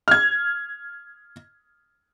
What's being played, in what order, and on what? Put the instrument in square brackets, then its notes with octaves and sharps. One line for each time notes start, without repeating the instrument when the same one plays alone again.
[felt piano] F6 G#6